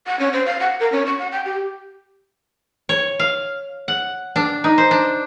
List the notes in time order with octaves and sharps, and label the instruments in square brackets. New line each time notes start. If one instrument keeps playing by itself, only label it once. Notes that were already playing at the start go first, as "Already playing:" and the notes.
[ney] F#5
C#4
C5
F5
F#5
A#4
C#4
C#6
F#5
G5
G4
[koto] C#5
F5
F#5
D4
D#4
C5
D4